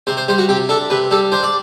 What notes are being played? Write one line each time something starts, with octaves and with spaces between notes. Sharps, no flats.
C3 C5
C5
G3 C5
F#4
C3 G4
D4 A4
C3 B4
G3 A4
D4 C5
D5